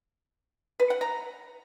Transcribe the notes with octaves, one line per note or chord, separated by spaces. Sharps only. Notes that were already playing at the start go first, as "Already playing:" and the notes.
B4
F#5
A#5